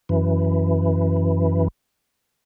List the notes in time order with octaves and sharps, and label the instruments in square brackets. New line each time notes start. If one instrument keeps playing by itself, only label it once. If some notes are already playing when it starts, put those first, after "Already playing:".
[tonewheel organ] F#2 E3